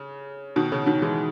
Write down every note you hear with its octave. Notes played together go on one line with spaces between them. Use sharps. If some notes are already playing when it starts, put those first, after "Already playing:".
Already playing: C#3
B2 D#3
C#3
B2 D#3
E3 G#3